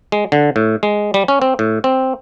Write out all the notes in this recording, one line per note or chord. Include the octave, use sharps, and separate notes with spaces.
G#3
D3
A2
G#3
G3
C#4
C4
A2
C4